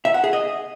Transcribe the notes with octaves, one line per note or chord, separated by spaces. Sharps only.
E5
F#5
G#4
D#5